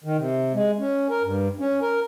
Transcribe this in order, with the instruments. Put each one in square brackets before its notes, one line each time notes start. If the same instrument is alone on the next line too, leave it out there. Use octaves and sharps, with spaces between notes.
[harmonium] D#3
C3
G#3
C#4
A#4
G2
C#4
A#4